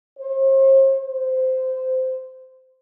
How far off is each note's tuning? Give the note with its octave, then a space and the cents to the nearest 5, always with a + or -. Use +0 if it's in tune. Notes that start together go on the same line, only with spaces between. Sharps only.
C5 +45
C5 -15